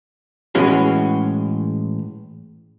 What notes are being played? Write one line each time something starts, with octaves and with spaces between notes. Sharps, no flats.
A2 E3 G#3 C#4 F#4 G#4